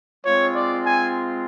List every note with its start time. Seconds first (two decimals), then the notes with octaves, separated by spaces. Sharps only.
0.24 G#3 C4 F4 C#5
0.55 D5
0.86 G#5